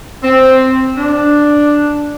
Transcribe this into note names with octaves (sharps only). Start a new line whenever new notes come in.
C4
D4